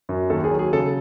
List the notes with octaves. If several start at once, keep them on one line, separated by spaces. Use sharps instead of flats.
F#2
D#2 A4
G#4
F#3
G#4
C#3 A4